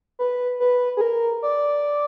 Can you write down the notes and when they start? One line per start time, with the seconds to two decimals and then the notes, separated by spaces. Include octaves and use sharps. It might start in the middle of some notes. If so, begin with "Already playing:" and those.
0.19 B4
0.60 B4
0.97 G#4
1.01 A#4
1.43 D5